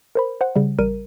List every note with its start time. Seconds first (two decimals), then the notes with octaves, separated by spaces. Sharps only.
0.15 A#4 C5 B5
0.41 C5 F#5
0.56 C#3 G3
0.78 A1 G3 A#4 D#7